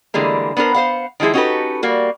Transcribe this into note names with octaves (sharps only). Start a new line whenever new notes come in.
D3 E3 G3 G#3 A#3
B3 D4 A4 A#4 C5
C5 F5 F#5
D#3 F3 G#3 E4 G#4
C#4 D#4 F#4 G4 A4 B4
G3 A#3 F#4